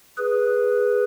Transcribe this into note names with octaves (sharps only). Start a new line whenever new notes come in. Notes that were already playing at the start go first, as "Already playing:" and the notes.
G#4 B4